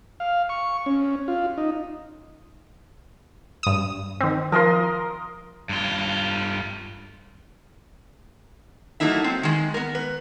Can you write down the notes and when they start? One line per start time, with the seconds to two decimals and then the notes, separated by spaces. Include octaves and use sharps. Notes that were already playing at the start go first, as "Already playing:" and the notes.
0.20 F5
0.49 C#6
0.86 C#4
1.28 F4
1.58 D#4
3.63 G2 D#6
4.20 D#3 C4
4.52 F3 F4 A#4 D#5 C6
5.69 G2 F4
9.00 F#3 A3 A#3 D#4 E4 E5
9.24 C4
9.43 D#3 G#3
9.74 B3 A#4
9.95 B4